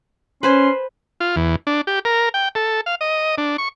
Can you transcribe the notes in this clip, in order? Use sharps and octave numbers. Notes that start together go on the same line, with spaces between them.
C#4 B4 C5 G#5 C6
F4
E2
D4
G4
A#4
G5
A4
F5
D#5
D4
C#6